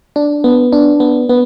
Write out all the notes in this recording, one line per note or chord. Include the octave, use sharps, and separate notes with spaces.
D4
B3
D4
B3
B3